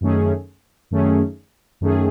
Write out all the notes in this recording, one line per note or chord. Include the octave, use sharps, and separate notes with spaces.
F#2 D#3 A3 C#4 G#4
F#2 D#3 A3 C#4 G#4
F#2 D#3 A3 C#4 G#4